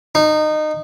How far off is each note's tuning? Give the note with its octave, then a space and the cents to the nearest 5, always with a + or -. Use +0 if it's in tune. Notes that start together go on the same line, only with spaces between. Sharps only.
D#4 -20